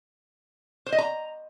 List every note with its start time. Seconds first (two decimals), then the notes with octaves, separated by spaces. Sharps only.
0.86 C5
0.92 D#5
0.98 A#5